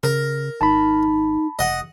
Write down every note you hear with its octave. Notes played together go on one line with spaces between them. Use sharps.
C#3 A#4
G#1 D#4 A5 B5
F1 D#5 F#5